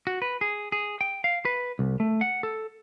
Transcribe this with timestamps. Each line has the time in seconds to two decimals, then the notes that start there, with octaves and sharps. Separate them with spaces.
0.07 F#4
0.22 B4
0.41 G#4
0.72 G#4
1.01 G5
1.24 F5
1.45 B4
1.79 C2
2.00 A3
2.21 F#5
2.43 A4